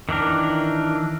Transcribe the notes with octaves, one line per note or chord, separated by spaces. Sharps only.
D#3 E3 D4 A#4